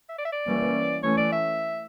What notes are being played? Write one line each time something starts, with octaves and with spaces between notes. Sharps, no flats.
E5
D5
E5
D5
E3 G3 A#3 C#4
E3 A3 C#4 C#5
D5
E5